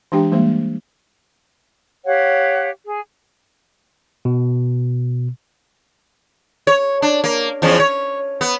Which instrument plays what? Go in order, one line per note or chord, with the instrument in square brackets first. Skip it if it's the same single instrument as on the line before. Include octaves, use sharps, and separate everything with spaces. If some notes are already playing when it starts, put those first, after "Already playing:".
[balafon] E3 G#3 D4 G4 G5
E3 G3 G#3 A#3 C5
[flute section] G4 C#5 F5 F#5
G#4
[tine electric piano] B2
[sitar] C#5
D4
A#3
E2 F3 C#4
C#5
B3